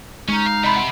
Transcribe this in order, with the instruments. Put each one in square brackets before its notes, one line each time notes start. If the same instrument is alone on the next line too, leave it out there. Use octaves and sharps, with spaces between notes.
[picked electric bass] G#3 [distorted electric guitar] C#4 [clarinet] D#4
[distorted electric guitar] F5
[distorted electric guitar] C3 [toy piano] D#5 B5 C6
[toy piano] F#5